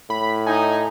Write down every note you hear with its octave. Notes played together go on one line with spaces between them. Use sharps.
A2 B5
D#4 G#5